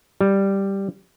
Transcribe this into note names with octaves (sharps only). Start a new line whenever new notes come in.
G3